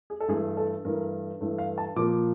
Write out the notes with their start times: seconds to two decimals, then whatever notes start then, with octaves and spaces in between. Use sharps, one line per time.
0.10 G#4
0.20 A4
0.28 G2 E3 A3 G#4
0.57 A4
0.85 G2 E3 A3 A#4
1.41 G2 E3 A3
1.58 F5
1.78 A5
1.96 A#2 F3 A#3 D6